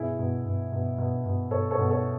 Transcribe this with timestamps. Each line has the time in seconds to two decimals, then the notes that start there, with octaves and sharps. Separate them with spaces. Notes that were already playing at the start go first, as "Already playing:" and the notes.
Already playing: B2 E4 G#4
0.19 B2
0.45 B2
0.72 B2
0.98 B2
1.25 B2
1.51 B2 A4 C#5
1.71 A4 C#5
1.78 B2
1.90 A4 C#5